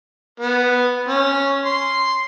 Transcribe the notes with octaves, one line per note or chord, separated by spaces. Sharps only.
B3
C#4
C6